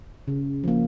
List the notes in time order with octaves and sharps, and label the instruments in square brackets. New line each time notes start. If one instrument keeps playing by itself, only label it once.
[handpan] C#3
F3 A#3